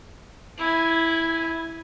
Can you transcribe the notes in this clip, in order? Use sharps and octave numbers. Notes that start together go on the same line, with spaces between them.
E4 G#5